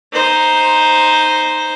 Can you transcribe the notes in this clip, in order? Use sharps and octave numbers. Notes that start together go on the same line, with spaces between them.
D#4 C5